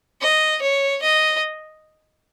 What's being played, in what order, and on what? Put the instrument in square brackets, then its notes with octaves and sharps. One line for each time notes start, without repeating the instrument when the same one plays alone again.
[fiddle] D#5
C#5
D#5